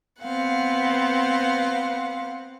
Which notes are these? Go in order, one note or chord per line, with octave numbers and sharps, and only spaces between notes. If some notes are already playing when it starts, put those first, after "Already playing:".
B3 C4 F5 F#5